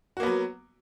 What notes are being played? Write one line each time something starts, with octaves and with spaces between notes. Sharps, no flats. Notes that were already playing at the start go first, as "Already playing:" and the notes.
F#3 A#3 B3 F#4